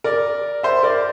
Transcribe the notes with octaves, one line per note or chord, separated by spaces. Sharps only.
A#4 D5
C5 E5
A#4 D5